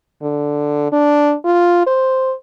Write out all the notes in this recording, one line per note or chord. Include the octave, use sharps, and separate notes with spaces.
D3
D4
F4
C5